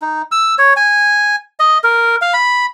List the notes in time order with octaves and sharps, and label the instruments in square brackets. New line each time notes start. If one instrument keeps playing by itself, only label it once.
[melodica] D#4
E6
C#5
G#5
D#5
A#4
F5
B5